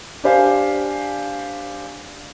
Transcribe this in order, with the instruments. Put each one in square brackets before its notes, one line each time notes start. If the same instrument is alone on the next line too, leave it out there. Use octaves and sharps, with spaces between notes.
[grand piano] D4 G4 C5 F5 G#5